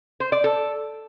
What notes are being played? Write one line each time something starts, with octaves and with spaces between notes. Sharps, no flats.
C5
D5
A4